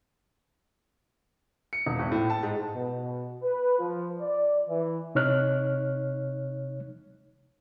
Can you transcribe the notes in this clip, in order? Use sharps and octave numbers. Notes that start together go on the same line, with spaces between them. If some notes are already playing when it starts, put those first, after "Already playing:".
C#7
E1
G#1
A2
A5
G#2
B2
B4
F3
D5
E3
C3 D#4 C#5 F6 F#6